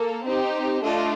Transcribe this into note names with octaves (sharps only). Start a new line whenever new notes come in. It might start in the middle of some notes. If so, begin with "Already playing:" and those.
Already playing: A#3 A4
C4 D#4 G4
A3 D4 F4 A4 D#5